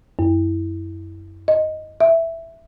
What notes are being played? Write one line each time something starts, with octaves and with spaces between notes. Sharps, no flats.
F#2
D#5
E5